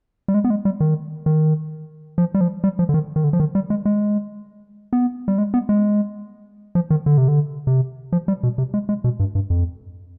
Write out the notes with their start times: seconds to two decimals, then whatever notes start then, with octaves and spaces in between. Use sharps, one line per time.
0.28 G3
0.34 G#3
0.44 B3
0.50 G#3
0.65 G3
0.80 D#3
1.26 D#3
2.18 F3
2.34 G3
2.41 F3
2.64 G3
2.79 F3
2.89 D3
2.94 D#3
3.16 D#3
3.24 D3
3.33 F3
3.40 D#3
3.55 G3
3.70 G#3
3.85 G#3
4.93 B3
5.28 G3
5.38 G#3
5.54 B3
5.69 G#3
6.75 F3
6.90 D#3
7.06 D3
7.18 C3
7.28 D3
7.67 C3
8.13 F3
8.28 G3
8.43 B2
8.58 C3
8.74 G#3
8.89 G#3
9.04 B2
9.20 G2
9.35 G2
9.50 F2